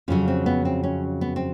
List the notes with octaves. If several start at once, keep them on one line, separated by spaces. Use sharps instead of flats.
F2 C#3 F#3 C#4
C4
B3
C4
C#4
B3
C4